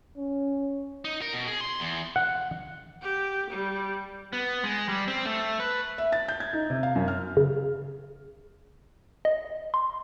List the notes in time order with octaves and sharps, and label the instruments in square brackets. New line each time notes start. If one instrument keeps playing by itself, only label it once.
[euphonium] C#4
[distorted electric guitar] D#4
A#4
B2
G#4
C6
E2
[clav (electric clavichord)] F#5
[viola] G4
G3
[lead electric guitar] B3
G#3
G3
C4
A3
B4
[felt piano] E5
A6
G6
G#6
D#4
C3
F5
F#2
F6
[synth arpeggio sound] C#3
D#5
C6